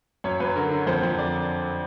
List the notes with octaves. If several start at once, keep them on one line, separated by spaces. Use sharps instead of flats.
F#2 C#5
F#2 B4
D3 A#4
D3
F2 C5
F2
D3 D5